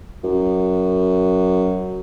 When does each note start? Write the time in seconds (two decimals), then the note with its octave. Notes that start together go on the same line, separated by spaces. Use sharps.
0.23 F#2